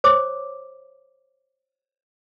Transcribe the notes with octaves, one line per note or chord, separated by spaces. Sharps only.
C5 C#5 D6